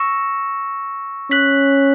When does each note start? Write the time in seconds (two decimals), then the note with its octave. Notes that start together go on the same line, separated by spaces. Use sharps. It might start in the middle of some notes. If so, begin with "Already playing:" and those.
Already playing: C#6 E6 A#6 C#7 E7
1.31 C#4 F#6 B6 F#7